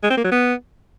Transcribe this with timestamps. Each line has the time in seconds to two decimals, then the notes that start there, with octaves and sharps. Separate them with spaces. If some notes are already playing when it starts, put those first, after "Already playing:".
0.03 G#3
0.10 C4
0.17 A#3
0.24 F#3
0.31 B3